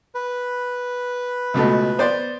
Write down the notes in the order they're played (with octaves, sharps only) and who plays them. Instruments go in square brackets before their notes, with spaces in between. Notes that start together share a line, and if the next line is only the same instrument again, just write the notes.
[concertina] B4
[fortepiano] C#2 B2 A3
B3 C5 D5